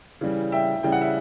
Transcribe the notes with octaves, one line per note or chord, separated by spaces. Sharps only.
C#3 E3 G3
E5 G5
C#3 E3 G3 G5
F#5
E5